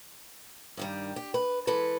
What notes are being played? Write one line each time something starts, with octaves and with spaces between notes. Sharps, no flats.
G2 D#3 G3
G4
B4
E3 G#3 A4 B4